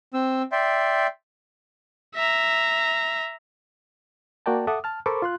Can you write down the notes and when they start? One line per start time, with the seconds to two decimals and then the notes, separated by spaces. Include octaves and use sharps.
0.14 C4 E6
0.52 D5 E5 G5 C6
2.15 E5 A#5
4.46 A#3 F#4 A#4 D5 G5 A5
4.67 A4 E5 F#5 D6 D#6
4.84 A5 F6
5.06 A4 A#4 C5 B5 C#6 D6
5.22 F4 C6 F#6